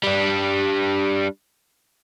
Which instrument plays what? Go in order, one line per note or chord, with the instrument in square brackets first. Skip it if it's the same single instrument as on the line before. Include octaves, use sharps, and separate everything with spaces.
[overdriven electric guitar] G3 D4